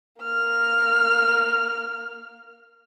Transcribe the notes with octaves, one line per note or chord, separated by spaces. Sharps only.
A#3 F6